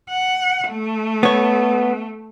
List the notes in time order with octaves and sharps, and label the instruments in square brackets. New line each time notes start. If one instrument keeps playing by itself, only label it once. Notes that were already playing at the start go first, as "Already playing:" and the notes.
[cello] F#5
A3
[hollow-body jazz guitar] B3 C#5